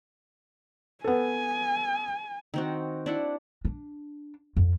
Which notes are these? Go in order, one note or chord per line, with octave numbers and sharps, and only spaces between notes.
B3 A4 G#5
D#3 C4 F#4
D4 E4 F#5
D4
F2